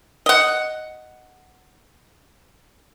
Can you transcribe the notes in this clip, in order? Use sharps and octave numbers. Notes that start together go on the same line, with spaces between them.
D#5 F#5